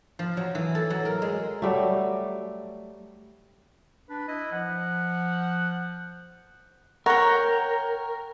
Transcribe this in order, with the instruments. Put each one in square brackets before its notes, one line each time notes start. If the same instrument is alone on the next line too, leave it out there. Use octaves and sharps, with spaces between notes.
[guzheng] F3
F#3
E3
A4
F#3
A#4
G#3
[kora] F#3 G3 A3
[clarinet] D4 [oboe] B4
[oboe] E4 [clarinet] D#5
[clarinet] F3 [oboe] F#5
[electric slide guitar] A#4 [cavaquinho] C#5 G5 [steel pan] F#5 [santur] A#5